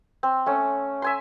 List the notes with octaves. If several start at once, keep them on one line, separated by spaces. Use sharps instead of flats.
C4
A3 C#4
E5 G#5 C6